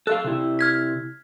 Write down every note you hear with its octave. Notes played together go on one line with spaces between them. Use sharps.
A4 E5 F5 F#6
C3 E4
F6 G#6 B6